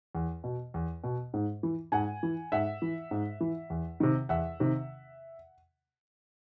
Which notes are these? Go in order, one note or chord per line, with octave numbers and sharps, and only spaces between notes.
E2
B2
E2
B2
G#2
E3
G#2 F#5 G#5
E3
G#2 E5 F#5
E3
G#2
E3
E2
C3 D#3
E2 E5 F#5
C3 D#3